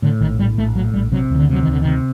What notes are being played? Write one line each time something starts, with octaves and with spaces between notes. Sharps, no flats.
A2 D3
A#1 D#3
A2 G3
A#1 A3
A2 F#3
A#1 G3
C3 F#3
D2 D#3
D3
C3 F#3
D#3
D2 D3
C3 D#3